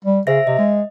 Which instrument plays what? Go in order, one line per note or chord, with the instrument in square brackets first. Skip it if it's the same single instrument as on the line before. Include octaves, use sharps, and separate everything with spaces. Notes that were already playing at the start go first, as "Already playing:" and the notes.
[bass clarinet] G3
[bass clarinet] C#3 [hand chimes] C5 E5 A#6
[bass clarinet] C3 [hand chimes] D#5
[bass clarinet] G#3